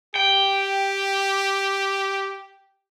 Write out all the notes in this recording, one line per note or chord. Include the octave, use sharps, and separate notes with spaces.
G4 G5